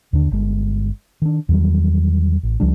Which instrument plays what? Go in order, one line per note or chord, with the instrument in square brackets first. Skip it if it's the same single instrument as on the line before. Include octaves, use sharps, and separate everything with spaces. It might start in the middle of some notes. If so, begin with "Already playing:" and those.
[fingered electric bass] D#2 D3 D4
G1 G#3
D#3 D4
E2 D#3 F#3 G3
A1
C#2 F3 G3 D4